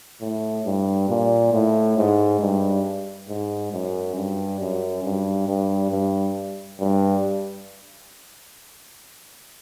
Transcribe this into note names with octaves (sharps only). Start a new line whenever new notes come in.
A2
G2
A#2
A2
G#2
G2
G#2
F#2
G2
F#2
G2
G2
G2
G2